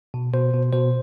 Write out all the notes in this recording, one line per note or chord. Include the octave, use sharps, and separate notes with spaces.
B2
B2 C5
B2
B2 C5